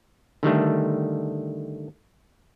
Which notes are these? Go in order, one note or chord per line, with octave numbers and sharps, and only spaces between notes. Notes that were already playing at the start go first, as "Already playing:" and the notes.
D3 D#3 G3 A3